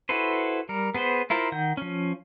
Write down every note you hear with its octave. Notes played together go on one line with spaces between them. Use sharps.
E4 F#4 A4 B4 C5
G3 A#4
B3 G#4 B4 C5
E4 F4 A#4 C5
D#3 F#5 G6
F3 C#4